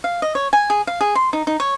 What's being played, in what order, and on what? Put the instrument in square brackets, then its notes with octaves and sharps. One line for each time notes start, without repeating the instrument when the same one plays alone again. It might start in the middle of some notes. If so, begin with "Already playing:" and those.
[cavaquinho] F5
D#5
C#5
G#5
G#4
F5
G#4
C6
D#4
D#4
C#5